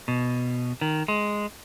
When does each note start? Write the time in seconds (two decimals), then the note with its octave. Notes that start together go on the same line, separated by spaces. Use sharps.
0.08 B2
0.81 D#3
1.08 G#3